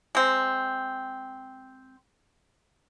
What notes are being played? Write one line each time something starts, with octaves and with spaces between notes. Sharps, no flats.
G#3 C4